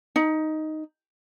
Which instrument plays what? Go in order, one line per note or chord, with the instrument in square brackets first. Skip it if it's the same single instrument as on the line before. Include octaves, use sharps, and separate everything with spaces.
[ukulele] D#4